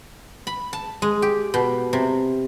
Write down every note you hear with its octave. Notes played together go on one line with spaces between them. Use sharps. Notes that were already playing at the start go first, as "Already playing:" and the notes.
B5
A5
G#3
G4
B2
C3